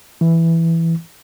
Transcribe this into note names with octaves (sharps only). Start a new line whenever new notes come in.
E3